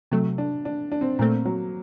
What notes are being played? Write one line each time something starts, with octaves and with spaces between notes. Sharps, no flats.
C3 F#3 A3
D4
D4
D4
C4
A#2 A3 A#3 C4
F#3